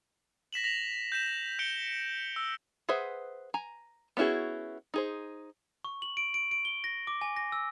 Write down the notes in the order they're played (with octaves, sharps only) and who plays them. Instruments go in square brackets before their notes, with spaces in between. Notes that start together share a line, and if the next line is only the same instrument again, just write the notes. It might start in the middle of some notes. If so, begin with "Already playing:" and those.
[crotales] A#6 B6 E7 F#7
A#6 B6 F7 F#7
G6 B6 E7
G6 C#7 D7 G7
E6
[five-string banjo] G#4 B4 C5 E5 F#5
G#5 A#5
B3 C#4 E4 F#4 G#4
D#4 G#4 C5
[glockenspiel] C#6
F#7
D7
D7
D7
G7
A#6
D6
G#5
A#6
E6